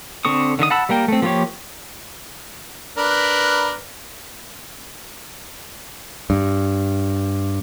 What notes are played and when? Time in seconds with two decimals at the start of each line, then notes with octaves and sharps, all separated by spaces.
0.25 D3 C4 A4 C#6 D#6
0.59 D3 D#3 E5 D#6
0.70 F#5 A5 B5 E6
0.89 G3 A#3 A#4 G5
1.08 A3 C4
1.22 F3 A#3 F4 G4 C#5
2.98 D4 A#4 B4
6.30 G2